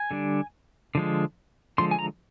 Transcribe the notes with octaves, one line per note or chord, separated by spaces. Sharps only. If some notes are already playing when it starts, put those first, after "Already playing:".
Already playing: G#5
D3 G3 D4
D3 F3 G#3
D3 F3 G#3 C6
G#5
A#5